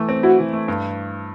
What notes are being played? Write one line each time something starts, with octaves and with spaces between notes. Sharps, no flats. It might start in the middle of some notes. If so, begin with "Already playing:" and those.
Already playing: E3 A3
C4
E4 F#4
E3
A3
G2